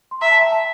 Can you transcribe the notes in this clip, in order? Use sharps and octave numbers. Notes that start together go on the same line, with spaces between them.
C6
E5 A#5
A5
G5
A5